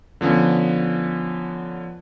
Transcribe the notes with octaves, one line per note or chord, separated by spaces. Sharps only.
D3 F3 B3 C#4